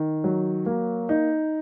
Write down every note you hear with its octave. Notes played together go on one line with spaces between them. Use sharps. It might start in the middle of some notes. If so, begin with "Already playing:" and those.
Already playing: D#3
F#3
A#3
D#4